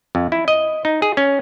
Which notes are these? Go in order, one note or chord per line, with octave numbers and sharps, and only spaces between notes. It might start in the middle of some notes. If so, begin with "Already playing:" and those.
F2
E4
D#5
D#4
G#4
C#4